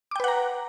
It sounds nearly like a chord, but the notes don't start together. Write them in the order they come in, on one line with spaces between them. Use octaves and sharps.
D6 G5 B4 F#5 A#5